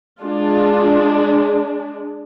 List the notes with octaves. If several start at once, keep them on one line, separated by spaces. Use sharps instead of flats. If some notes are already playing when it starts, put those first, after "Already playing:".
G#3 D4 F4